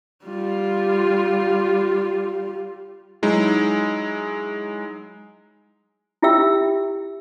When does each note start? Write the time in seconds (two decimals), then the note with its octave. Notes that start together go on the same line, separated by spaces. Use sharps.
0.25 G3 F4
3.22 F#3 G#3 D#4 E4
6.22 E4 F4 G4 E5 G5 E6